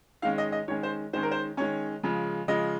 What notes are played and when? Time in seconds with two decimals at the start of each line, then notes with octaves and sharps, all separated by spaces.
0.22 D#3 G#3 C#4 F5
0.38 D#5
0.52 D#5
0.68 D#3 G#3 C#4 C#5
0.83 C5
1.13 D#3 G#3 C#4 C5
1.23 A#4
1.31 C5
1.57 D#3 G#3 C#4 C#5
2.03 C#3 F3 G#3
2.48 C#3 F3 G#3 D#5